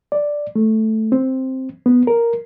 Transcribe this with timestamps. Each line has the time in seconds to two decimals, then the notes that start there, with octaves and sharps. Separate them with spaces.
0.12 D5
0.56 A3
1.12 C4
1.86 B3
2.07 A#4